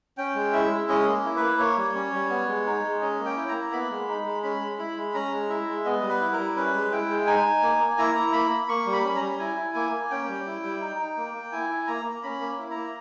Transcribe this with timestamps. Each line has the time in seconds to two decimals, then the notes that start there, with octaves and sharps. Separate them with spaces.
0.18 C#4 G5
0.35 G#3
0.53 E4 E5
0.71 G#3
0.88 C#4 D#5
1.07 A#3
1.24 E4
1.36 B4
1.42 A#3
1.60 A#3 C#5
1.77 G3
1.95 C#4
2.13 G3
2.30 B3
2.48 G#3
2.66 D#4
2.84 G#3
3.01 C#4 D#5
3.19 A#3
3.25 G5
3.37 E4
3.48 A#5
3.55 A#3
3.72 B3 B5
3.90 G#3
4.08 D#4
4.25 G#3
4.43 C#4 B5
4.61 G#3
4.79 E4 B5
4.97 G#3
5.14 C#4 A#5
5.31 G#3
5.49 E4 E5
5.68 G#3
5.85 B3 D#5
6.02 G3
6.09 B4
6.21 E4
6.33 A#4
6.38 G3
6.56 C#4 B4
6.74 G#3
6.92 E4 G5
7.09 G#3
7.26 D#4 G#5
7.44 D#4
7.62 A#3
7.81 A#3
7.98 E4 A#5
8.15 E4
8.33 A#3 B5
8.51 A#3
8.68 A#3 C#6
8.86 G3
8.93 B5
9.05 C#4
9.16 A#5
9.22 G3
9.39 E4 G#5
9.57 E4
9.74 A#3 G#5
9.92 A#3
10.10 C#4 G5
10.29 G3
10.46 E4
10.63 G3
10.81 D#4
10.99 D#4
11.17 A#3
11.34 A#3
11.52 E4 G#5
11.70 E4
11.87 A#3 A#5
12.06 A#3
12.23 C#4 B5
12.41 A#3
12.59 E4
12.71 A#5
12.76 A#3